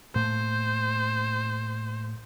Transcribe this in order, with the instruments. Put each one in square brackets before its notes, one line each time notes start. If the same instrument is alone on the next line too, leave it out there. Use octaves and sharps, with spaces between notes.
[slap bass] A2 A3 A#3 [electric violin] C5